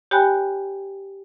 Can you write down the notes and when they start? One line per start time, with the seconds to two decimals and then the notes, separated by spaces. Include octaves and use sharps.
0.11 G4 C#5 G5 G#5 B5 F#6